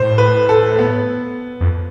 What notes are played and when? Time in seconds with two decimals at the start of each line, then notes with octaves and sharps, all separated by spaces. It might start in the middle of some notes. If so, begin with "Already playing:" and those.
Already playing: A2 C5
0.18 B4
0.49 A4
0.79 B3
1.61 F2